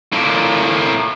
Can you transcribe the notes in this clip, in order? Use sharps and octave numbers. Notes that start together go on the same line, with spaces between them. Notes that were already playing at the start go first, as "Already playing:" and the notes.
A2 A#3